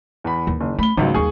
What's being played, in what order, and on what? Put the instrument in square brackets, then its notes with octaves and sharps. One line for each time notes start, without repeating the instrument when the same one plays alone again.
[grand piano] E2 B5
[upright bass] D#2 D#3
[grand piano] F#1
[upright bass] A3 [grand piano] B5 G7
[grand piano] G#1 C#2 F#3 [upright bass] G3
[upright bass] D#2 G3 [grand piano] G#4 C#6